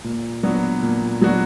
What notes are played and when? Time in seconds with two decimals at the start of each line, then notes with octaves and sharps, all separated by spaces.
0.04 A#2
0.43 F#3 B3 D4 F#4
0.82 A#2
1.21 F#3 B3 D4 F#4